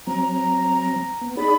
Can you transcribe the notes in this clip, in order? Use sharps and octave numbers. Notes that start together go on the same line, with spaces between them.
F#3 C4 A#5
B3
D#4 G#4 D5 B5